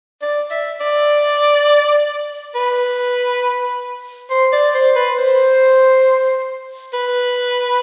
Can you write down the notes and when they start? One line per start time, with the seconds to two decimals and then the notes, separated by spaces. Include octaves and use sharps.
0.22 D5
0.51 E5
0.81 D5
2.55 B4
4.30 C5
4.53 D5
4.74 C5
4.96 B4
5.18 C5
6.94 B4